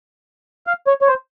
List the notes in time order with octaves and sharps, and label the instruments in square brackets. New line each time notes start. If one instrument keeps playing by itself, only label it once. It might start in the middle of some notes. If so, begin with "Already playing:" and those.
[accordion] F5
C#5
C#5
C5